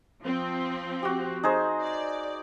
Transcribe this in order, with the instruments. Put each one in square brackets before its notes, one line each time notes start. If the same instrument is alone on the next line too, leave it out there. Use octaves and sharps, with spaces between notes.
[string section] F3 C4
[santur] F#4 G4
D#4 G#4 C5
[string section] D5